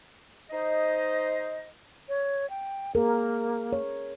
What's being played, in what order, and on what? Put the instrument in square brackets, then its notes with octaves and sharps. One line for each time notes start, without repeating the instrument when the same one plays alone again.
[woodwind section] D#4 C5 D#5
[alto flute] C#5
G5
[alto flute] A#3 [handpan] G#4 A#4
[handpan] C#5